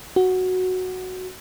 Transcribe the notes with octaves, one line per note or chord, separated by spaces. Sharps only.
F#4